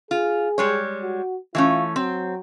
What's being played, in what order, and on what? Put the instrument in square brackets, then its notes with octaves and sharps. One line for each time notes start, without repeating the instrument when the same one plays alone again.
[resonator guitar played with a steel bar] F4 [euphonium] G#4
[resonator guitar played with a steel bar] G3 G#3 C#5
[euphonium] F#4
[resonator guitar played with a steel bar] E3 A3 C#4 [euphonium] F4
[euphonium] F#3 [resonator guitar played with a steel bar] C4